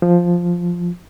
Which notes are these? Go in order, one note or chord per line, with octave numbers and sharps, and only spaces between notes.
F3